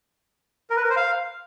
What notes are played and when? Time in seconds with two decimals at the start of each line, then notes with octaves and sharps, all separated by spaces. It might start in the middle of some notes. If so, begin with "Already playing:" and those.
0.70 A#4
0.77 B4
0.83 A#4
0.90 C5
0.97 F5